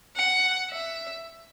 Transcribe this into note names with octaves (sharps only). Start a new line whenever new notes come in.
F#5
E5